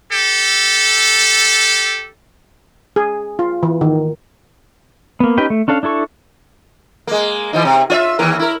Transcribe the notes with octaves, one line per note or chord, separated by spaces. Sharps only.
G4 A4
G#4
F4
E3
D#3
A#3 B3
C#4 D#4 G4 B4 G5
A3
C#4 D4 A4 F5
D4 E4 A4 C#6
G#3 A#3
E3 F3 D#4
C3
F4 C#5 E5
D#2 E3 A#4
E4 A#4